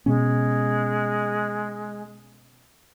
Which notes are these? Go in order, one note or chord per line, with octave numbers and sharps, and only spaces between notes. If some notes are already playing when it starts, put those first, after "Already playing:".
B2 G#3 B3 C#4